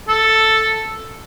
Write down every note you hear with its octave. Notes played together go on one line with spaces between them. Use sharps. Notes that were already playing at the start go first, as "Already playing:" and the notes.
A4